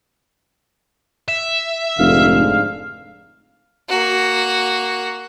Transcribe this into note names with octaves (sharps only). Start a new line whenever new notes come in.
E5
F1 G#2 D3 F5
A#3 F#4